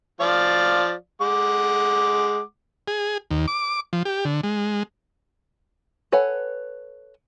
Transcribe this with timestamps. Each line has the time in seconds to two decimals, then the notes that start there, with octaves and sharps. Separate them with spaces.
0.21 F3 D5 F5
1.22 G#3 F#5 D6
2.88 G#4
3.31 D#2
3.48 D6
3.93 F3
4.05 G4
4.25 D3
4.43 G#3
6.12 A4 B4 C#5 F#5 G#5